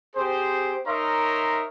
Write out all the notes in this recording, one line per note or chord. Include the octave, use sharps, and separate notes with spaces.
C4 G4 G#4 C5
D#4 A#4 C#5 E5 A#5 C6